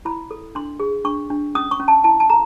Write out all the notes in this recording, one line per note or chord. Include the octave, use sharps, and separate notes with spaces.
E4 B5
A4
D4 C6
G#4
D4 C#6
D4
C#4 D#6
C#6
C#4
A5
E4 A5
A5
A4 A#5